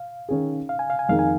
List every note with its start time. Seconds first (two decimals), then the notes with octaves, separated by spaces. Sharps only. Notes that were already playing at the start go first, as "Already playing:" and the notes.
Already playing: F5
0.29 D#3 C#4 G#4
0.69 F5
0.79 G#5
0.90 F5
0.99 G#5
1.09 F2 D#3 A#3 D#4 G#4 F5
1.19 G#5